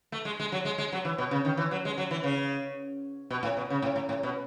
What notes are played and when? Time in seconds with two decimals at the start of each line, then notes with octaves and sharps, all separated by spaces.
0.12 A3
0.25 G#3
0.40 G#3
0.52 F#3
0.65 G#3
0.78 G#3
0.92 F#3
1.05 E3
1.18 B2
1.31 C#3
1.45 D#3
1.57 E3
1.71 F#3
1.85 G#3
1.98 F#3
2.11 E3
2.24 C#3
3.30 B2
3.43 A2
3.57 B2
3.70 C#3
3.82 A2
3.96 A2
4.09 A2
4.23 B2